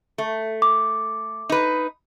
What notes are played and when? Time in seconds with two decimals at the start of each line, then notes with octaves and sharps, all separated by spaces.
0.18 A3
0.62 D6
1.49 D#4 B4